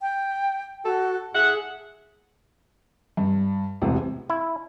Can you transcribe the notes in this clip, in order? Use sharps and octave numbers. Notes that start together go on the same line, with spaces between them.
G5
F#4 A4
A2 G#4 E5 F#5
G2
E1 A1 C3
E4